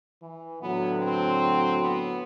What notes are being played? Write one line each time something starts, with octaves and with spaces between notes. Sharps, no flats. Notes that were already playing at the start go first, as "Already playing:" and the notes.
E3
A2 D3 F#3 B3
C4
B3